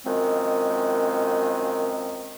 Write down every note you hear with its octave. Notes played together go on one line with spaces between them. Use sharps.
F#2 D#3 F3 G#3 C4